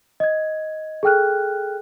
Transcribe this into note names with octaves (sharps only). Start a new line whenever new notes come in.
D#5 G#6
G#4 A4 G5 F6 F#6